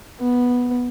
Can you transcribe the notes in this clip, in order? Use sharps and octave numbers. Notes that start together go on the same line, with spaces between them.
B3